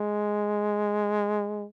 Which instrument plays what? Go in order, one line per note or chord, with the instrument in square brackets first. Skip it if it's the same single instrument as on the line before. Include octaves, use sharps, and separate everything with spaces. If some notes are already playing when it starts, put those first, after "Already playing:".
Already playing: [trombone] G#3